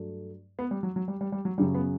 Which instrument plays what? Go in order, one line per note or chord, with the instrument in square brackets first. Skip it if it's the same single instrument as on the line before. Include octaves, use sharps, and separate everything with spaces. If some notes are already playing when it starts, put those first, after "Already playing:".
Already playing: [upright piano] G2 F#3 A3 D4 F#4
[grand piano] B3
G3
F#3
F#3
G3
G3
G3
F#3
[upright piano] F#2 C#3 F#3 [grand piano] G3
[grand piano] B3